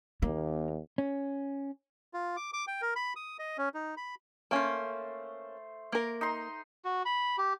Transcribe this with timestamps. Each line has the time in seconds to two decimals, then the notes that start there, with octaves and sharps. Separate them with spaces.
0.22 D#2 A#3
0.98 C#4
2.14 F4
2.36 D6
2.53 D6
2.67 G5
2.82 A#4
2.96 B5
3.16 D#6
3.39 D#5
3.58 C#4
3.74 D#4
3.97 B5
4.51 A3 A#3 C#4 C5
5.92 A#3 A#4
6.21 D#4 C6
6.85 F#4
7.05 B5
7.38 G4